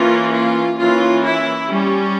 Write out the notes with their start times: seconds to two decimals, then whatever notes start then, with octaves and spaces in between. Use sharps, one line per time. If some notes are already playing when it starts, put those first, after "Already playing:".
Already playing: E3 A#3 C#4 F4
0.33 F4
0.78 E3 A#3 C#4 F4
1.23 E4
1.68 G3 C#4